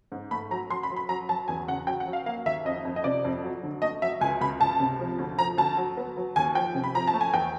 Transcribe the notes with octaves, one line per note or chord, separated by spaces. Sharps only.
G#2
A3 B5
F#3 A#5
F#3 C6
B5
F#3
B5
F#3 A#5
F#3 A5
E2 G#5
C#3 F#5
F#3 G5
F#5
F#3
F5
A#3 F5
D#2 E5
F2 D#5
F2
D#5
C3 D5
F2
F#3
D3
A3 D#5
F#3 E5
C#2 G#5
C#2 B5
C#2 A5
C3
F3
D2
F3 A#5
D2 A5
F#3
B3
F#3
D#2 G#5
F3 G5
C3
B5
F3 A#5
A5
A3
G#5
E2 G5